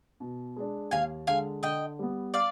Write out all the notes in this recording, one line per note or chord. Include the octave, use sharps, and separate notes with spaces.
B2
G#3 D4
D#2 F5 G#5
D3 G#3 F5 G#5
D3 D#5 G5
G3 B3
D5 F5